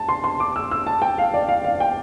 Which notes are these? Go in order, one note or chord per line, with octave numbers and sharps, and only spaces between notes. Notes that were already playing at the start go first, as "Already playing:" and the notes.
Already playing: A5
C6
C6
D6
E6
E6
A5
G5
F5
D5
F5
F5
G5